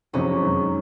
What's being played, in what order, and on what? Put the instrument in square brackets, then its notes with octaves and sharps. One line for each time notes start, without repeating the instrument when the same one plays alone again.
[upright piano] F#1 F2 C3 [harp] C#4
[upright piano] F#2 D#3 G#3